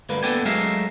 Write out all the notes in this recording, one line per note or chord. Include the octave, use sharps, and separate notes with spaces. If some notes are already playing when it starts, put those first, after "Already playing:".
D2 G2 A#3 B4
A#3 B3 A4 D5 G5 G#5
F#3 G#3 A3 A#4 E5 F5